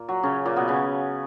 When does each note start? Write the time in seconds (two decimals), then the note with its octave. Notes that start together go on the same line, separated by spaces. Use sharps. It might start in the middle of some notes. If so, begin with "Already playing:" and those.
Already playing: A#2 A#3
0.09 F#3
0.23 C#3 C#4
0.45 A#2 A#3
0.56 B2 B3
0.68 C#3 C#4